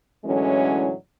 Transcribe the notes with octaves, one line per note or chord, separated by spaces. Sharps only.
A2 D3 E3 F#3 G#3 C#4